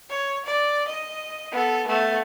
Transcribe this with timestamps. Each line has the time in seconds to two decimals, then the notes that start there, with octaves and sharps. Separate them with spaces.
0.10 C#5
0.45 D5
0.88 D#5
1.52 B3 A4
1.87 A3 B3